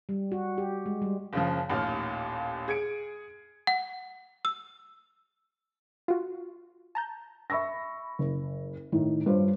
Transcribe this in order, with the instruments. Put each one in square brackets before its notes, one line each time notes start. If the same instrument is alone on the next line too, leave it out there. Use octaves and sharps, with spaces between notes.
[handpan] G3
F#4
G4
G#3
G3
[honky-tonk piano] F#1 C#3 F3
A1 D#2 A#2 F6
G#4 G#6 C#7 D7
[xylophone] F#5
E6
[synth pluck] F4 F#4
A5 A#5 G6
[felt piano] E5 B5 C#6 E6 A#6
F#1
A2 D#3
G2 F4 C5 C#5